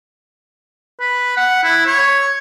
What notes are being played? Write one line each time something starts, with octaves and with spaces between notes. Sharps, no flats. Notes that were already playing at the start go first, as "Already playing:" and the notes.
B4
F#5
E4
C#5